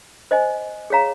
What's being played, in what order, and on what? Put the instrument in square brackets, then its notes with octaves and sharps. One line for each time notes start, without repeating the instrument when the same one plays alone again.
[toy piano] C5 D#5 G#5
G#4 C#5 F5 A#5